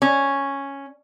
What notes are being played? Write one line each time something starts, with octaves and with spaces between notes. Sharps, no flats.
C#4